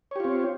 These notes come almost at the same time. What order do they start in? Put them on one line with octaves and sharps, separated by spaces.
C#5 G4 F4 C4